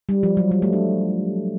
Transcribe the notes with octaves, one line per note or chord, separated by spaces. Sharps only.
G3
F3
F#3
G3
A3
D4